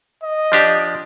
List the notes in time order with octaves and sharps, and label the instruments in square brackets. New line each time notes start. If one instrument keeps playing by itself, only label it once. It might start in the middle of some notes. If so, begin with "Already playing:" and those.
[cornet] D#5
[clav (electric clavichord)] F3 D4 G4